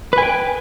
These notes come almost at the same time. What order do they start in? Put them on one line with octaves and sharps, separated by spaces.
B4 G#5 G5